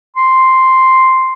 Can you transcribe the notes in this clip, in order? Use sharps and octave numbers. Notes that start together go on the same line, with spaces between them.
C6